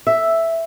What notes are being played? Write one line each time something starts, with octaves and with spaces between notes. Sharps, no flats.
E5